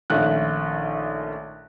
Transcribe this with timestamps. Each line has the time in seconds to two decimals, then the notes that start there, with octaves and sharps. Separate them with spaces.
0.10 A#1 D#3 A3 C#4 F#6